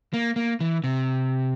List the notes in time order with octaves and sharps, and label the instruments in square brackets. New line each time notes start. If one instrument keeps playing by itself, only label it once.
[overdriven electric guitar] A#3
A#3
E3
C3